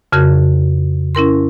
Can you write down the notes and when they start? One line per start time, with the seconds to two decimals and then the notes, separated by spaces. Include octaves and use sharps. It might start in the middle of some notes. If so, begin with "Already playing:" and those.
0.12 F2 C#3 F#4 A#4 F#6
1.15 C#4 E4 A#4 C6